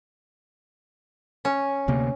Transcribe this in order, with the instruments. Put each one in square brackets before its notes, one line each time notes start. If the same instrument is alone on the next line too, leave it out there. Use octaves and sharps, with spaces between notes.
[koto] C#4
[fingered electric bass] D2 C3 A#3